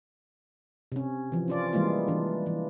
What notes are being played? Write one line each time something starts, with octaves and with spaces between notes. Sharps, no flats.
C3 C#4
E3 F3
C#4 F4 D5
E3 G3 G#3 A#3 F4
E3 D4
E3